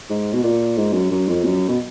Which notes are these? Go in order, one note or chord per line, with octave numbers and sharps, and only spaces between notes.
G#2
B2
A#2
G#2
F#2
F#2
F2
F#2
B2